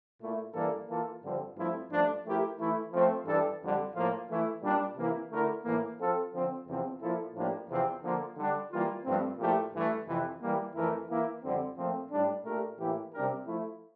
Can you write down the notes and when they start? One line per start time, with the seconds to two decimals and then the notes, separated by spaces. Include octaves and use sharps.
0.21 A#2 A3 E4
0.54 G2 E3 A#3 D4 A4
0.88 E3 A#3 F4 A4
1.23 G2 D3 F3 C4
1.56 G2 F3 A3 C4 E4
1.90 G2 F3 A3 D4
2.25 F3 A3 E4 G4 A#4
2.58 E3 A3 E4
2.92 F3 A3 C4
3.26 G2 E3 G3 D4 A4
3.60 F2 D3 G3
3.94 A2 F3 A#3 F4
4.29 E3 A3 E4
4.62 A#2 G3 D4
4.97 C3 E3 A#3 E4
5.31 D3 A3 E4 A#4
5.64 A2 E3 A#3
5.98 F3 C4 F4 A4
6.33 D3 F3 C4
6.67 E2 C3 F3 C4
7.01 A#2 F3 A#3 E4 A4
7.35 A2 F3 A#3 D4 G4
7.69 E2 C3 F3 C4
8.03 D3 F3 A#3
8.37 D3 G3 D4
8.71 E3 G3 A#3 F4
9.05 G2 F3 A3 C4
9.38 A#2 F3 A3 E4 G4
9.73 G2 E3 A3
10.07 F2 C3 E3
10.41 E3 G3 A#3
10.75 F2 E3 A3 E4 A#4
11.09 E3 A#3 E4
11.44 F2 D3 G3 C4
11.77 A#2 F3 A3 C4
12.11 A2 G3 D4
12.45 A#2 A3 D4 G4 A#4
12.79 A2 E3 A#3 E4 G4
13.14 C3 G3 D4 G4 A#4
13.47 F3 A3 E4